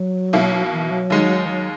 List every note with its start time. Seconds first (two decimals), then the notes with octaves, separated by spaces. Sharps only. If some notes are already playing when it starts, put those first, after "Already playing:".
Already playing: F#3
0.33 B1 B2 A#3 E4
0.72 E3
0.91 F#3
1.10 D#2 D#3 G#3 D#4
1.45 E3
1.49 F#3